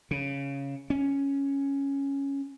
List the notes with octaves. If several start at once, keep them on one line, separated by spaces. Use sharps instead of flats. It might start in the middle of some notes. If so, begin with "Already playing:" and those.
C#3
C#4